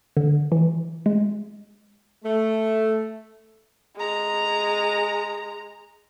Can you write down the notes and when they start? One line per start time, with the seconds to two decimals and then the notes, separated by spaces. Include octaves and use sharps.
0.17 D3
0.52 E3
1.06 G#3
2.23 A3
3.96 G#3 A#5